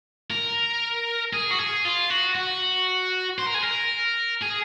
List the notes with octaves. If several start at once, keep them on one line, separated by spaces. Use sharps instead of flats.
A#4
G#4
F#4
G#4
F4
F#4
F#4
C5
A#4
G#4
A#4
G#4